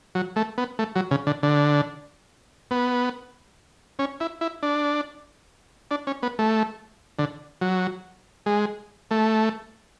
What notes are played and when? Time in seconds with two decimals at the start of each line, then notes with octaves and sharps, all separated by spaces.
0.15 F#3
0.36 A3
0.58 B3
0.79 A3
0.96 F#3
1.11 C#3
1.27 D3
1.43 D3
2.71 B3
3.99 C#4
4.20 E4
4.41 E4
4.63 D4
5.91 D4
6.07 C#4
6.23 B3
6.39 A3
7.19 D3
7.61 F#3
8.46 G#3
9.11 A3